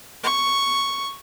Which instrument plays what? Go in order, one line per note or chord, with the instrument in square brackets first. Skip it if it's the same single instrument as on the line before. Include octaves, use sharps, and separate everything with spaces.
[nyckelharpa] C#6